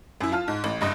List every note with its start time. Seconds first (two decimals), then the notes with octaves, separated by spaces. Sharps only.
0.20 F#2 E4
0.32 F4 A5 F6
0.48 G#2
0.64 A1
0.81 F#1 G2 D#5